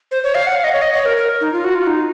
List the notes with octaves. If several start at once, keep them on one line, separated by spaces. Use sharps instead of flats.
C5
C#5
F5
F#5
F5
D#5
C#5
D#5
C#5
A#4
A#4
D#4
F4
F#4
F4
D#4